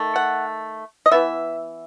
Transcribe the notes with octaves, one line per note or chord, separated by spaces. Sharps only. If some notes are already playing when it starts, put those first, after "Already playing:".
Already playing: D#3 A3
F#5
D#5
E3 B3 E5